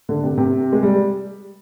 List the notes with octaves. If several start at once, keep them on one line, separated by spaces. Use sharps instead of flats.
D3
C3
C3
G#3
G3